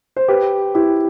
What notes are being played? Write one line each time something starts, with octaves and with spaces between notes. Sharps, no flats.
C5
G4 B4
E4 G4